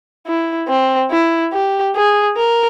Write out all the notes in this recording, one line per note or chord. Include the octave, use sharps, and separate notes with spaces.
E4
C4
E4
G4
G#4
A#4